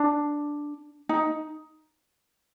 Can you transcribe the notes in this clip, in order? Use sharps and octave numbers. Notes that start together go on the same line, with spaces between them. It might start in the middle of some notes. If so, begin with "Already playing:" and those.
Already playing: D4
D#4